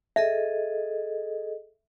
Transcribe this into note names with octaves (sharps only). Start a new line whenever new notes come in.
G#4 A4 D#5 E5